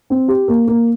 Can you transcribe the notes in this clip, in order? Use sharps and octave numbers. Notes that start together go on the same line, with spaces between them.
C4
G4
A#3
A#3